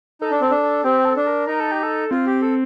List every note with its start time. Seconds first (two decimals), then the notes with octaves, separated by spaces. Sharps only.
0.21 D#4 A4
0.31 D4
0.41 C4 A4
0.51 D4
0.63 A4
0.84 C4 G4
1.05 A4
1.16 D4
1.27 A#4
1.47 D#4 A#4
1.60 A4
1.72 G4
1.83 A4
2.11 C4 F4
2.26 G4
2.42 A4